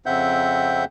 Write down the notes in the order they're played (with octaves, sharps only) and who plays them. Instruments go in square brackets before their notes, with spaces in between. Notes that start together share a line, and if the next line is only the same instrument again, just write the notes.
[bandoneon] F2 C#3 C4 E5 F#5 G6